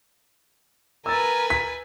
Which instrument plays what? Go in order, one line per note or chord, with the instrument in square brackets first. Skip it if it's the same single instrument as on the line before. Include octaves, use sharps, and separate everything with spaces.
[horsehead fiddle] A#4 [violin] B4 G#5 [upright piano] E6 A6
[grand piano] B6